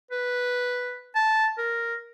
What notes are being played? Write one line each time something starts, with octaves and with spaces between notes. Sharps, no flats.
B4
A5
A#4